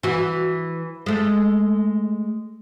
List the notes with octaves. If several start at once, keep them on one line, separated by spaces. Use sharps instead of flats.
E3 F#4
G#3 A3